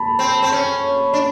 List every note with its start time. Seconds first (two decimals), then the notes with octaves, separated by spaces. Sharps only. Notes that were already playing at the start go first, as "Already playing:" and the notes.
Already playing: A5 B5
0.19 C4
0.43 C4
0.52 C#4
1.14 D4